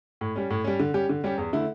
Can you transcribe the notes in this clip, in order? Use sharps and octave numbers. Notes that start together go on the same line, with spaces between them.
A2
G3 C#4
A2
G3 C#4
D3
G3 C#4 G4
D3
G3 C#4 G4
E2
D3 A3 E4